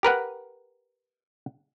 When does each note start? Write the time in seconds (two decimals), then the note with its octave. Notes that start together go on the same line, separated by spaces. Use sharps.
0.03 G4 A#4 B4 F#5